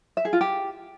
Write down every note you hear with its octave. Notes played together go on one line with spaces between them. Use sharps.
E5
G#4
F4
G4